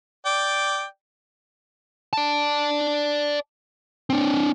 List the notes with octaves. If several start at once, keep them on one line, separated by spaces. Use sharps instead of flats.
D5 G5
D5 A5
C4 D4